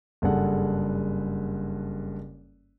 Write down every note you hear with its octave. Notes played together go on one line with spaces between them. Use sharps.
F#1 G2 G#4 A4 F#5